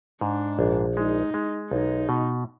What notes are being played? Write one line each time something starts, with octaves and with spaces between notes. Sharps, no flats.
G#2 D4
A#1
G#3 D#4
G#3
B1 D#4
B2